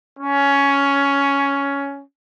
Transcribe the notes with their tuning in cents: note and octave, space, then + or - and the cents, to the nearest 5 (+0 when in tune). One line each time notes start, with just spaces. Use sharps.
C#4 +10